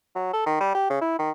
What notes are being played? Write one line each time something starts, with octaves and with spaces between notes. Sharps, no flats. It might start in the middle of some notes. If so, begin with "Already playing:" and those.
F#3
A4
D#3
G3
G4
C#3
E4
D#3